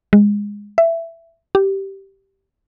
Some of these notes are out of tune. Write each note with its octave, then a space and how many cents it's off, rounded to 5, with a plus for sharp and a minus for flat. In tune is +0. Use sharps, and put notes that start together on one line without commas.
G#3 -15
E5 +15
G4 -10